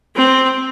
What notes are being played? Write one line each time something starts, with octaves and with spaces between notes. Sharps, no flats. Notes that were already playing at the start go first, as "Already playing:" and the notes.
C4